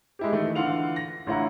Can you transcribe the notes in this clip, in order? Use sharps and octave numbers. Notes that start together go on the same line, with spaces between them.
G#3 E4 G4
D#3 E3 A3
D3 E3 F4 F5 F#5 F7
A#6
A1 D3 E4 F4 F#5 A#5